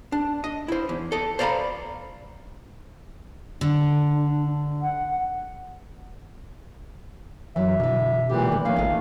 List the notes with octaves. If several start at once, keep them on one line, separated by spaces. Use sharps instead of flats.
D4
D#5
E4 C5
E2
A4 D#5
C5 D5 F5 F#5 A#5 B5
D3 D4
F#5
F#2 E3 F#3 E5
B2 D3 E3
A#2 D3 E3 G#3 G4
E2 D#3 A3
D#3 F3 A3 A#3 C#4 F5
A1 F4 A4 D#5